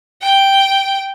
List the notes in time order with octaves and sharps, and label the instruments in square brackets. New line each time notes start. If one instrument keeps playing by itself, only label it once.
[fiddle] G5